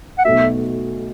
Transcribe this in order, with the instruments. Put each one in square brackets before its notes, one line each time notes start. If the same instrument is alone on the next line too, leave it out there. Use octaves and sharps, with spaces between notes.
[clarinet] F#5
[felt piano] B1 B2 A3 F#4 [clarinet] E5